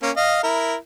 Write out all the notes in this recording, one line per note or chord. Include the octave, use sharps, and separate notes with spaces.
A#3 C#4
D#5 F5
E4 A#4